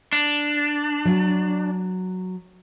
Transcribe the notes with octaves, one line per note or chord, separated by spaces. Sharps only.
D4
F#3